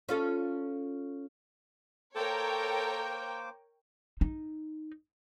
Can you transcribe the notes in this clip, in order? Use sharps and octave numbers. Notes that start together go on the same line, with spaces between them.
C#4 F4 A4
A#3 A4 A#4 C5 C#5 G5 D6
D#4